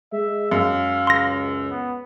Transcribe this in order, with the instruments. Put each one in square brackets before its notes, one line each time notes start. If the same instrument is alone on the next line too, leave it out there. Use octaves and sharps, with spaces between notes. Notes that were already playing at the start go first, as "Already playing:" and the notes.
[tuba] G#3 [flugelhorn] E5
[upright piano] F#2 [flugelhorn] F5
[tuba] C#2 [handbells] C6 A#6
[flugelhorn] B3